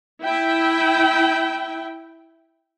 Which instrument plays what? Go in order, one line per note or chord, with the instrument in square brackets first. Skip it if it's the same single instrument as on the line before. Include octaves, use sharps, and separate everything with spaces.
[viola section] E4 G5